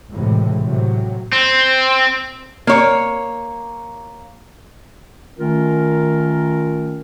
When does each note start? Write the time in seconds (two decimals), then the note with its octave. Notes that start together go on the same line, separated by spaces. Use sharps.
0.11 C#2 F#2 A2 C3 E3
0.63 A2 C3 F#3
1.33 C4
2.67 A#3 C#5
5.38 D#3 A3 C#4 F4 A#4